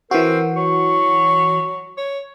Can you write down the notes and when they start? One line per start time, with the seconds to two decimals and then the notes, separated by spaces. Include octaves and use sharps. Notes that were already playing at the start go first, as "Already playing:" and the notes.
0.11 E3 C4 F#4 A#4
0.56 F#3 C#6
1.98 C#5